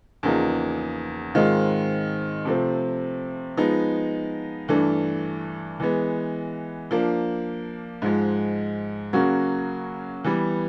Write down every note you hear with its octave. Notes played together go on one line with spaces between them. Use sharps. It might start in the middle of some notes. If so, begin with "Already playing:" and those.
E2 C#3 F3 A#3 D#4
G#2 D#3 G#3 C4 F4
C3 F3 A3 C4
F3 G#3 B3 D#4
G2 E3 A3 D4
E3 G#3 B3
F3 A#3 D4
G#2 F3 G#3
C#3 F#3 A#3 C#4 F#4
E3 G3 B3